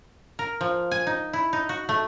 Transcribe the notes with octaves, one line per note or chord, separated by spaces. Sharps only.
A#4
F3
G#5
D#4
E4
D#4
F#4
A3